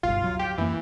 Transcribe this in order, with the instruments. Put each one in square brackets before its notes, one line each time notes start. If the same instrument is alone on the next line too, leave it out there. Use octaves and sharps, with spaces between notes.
[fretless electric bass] F#1 B1 G2 [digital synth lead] F4
[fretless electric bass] D1 F#3
[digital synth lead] G4
[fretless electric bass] F#2 A#3 [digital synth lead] E3